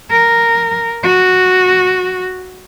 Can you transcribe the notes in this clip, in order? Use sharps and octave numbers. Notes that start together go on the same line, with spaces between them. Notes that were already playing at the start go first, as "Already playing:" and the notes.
A#4
F#4